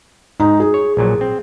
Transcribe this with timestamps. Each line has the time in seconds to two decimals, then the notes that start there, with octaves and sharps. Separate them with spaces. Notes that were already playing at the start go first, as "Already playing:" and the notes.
0.40 G#2 D#4
0.60 G#4
0.74 C#5
0.97 A#1 A#2 F#3
1.21 C4